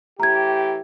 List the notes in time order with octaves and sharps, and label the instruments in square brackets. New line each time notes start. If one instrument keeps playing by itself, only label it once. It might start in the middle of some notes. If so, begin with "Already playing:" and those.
[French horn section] A2 E3 G4 [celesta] A#5 G#6